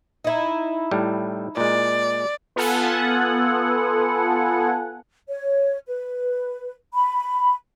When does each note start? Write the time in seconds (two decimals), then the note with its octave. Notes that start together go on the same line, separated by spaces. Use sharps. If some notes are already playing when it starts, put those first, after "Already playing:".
0.24 D#4 E4
0.91 A2 G3
1.57 A#2 G#3 D5
2.56 B3 F4 A4 F#5 G#5
5.29 C#5
5.87 B4
6.94 B5